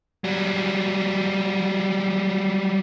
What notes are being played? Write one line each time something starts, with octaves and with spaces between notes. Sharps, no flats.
F#3 G3